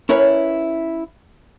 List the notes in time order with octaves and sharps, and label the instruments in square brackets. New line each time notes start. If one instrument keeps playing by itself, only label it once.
[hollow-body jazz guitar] C#4 E4 A#4 B4 C#5